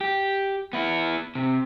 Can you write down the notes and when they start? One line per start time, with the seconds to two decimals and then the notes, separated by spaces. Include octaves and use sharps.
0.01 G4
0.73 B3 E4
1.35 C3